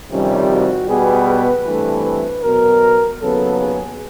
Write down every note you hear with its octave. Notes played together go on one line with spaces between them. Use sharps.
F2 C3 D#3 G3 C#4
F#4
B2 G3 B3 G#4
B4
G2 E3 A3 C4
B4
B2 F#3 B3 A#4
D#2 C#3 F#3 B3 A4
G#4